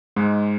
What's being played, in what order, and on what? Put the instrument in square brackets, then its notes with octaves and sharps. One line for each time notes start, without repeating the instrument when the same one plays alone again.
[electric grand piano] G#2 G#3